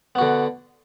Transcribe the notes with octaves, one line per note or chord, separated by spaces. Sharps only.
D3 B3 F#4